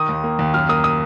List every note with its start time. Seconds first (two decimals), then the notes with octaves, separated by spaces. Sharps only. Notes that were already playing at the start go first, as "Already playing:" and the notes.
Already playing: D#3 D#6
0.09 D#2
0.24 A#3
0.39 D#2
0.54 F#2 F6
0.69 A#3 D#6
0.84 D#6